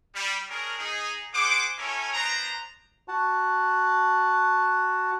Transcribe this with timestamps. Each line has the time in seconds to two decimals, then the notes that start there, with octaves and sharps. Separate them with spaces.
0.15 G3
0.49 C#4 D4 G#4 A#4
0.78 D#4 G#4
1.34 G#4 C5 F#5 D6
1.78 C#4 E4 A4 A#4 C#5 G#5
2.13 B3 D4 C5 A#5
3.08 F#4 F#5 A5